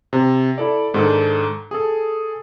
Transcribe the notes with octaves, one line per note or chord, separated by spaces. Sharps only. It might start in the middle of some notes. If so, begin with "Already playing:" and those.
C3
E4 A4 D5
G#2 D#3 D4 A4
G#4 A4